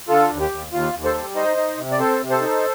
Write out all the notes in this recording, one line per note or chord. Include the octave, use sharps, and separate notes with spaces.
D3 F4 A4
D#2
G4
D#2
D#2 F4
D#2
A4 C5
G3
D#4 C5 D#5
D#4
C3
D5
C4 A4 C5
C3
A4 C5
D#4